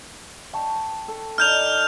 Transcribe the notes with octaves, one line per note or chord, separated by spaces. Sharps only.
G5 A5 C#6
A4
D#4 D5 F6 G6 F7